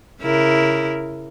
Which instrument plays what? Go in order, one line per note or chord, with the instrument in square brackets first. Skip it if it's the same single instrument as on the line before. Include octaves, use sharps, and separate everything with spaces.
[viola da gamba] C#3 E4 A#4